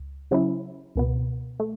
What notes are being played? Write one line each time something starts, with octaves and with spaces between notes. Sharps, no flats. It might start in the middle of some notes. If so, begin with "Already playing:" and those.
Already playing: C#2
C#3 F#3 C#4 E4
C#2 B2 B3
A3